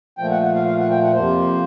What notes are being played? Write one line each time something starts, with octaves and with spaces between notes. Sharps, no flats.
A#2 F3 A3 G5
F#5
F#5
F5
F5
F#5
G5
F#5
F2 C3 F3 A#3 C5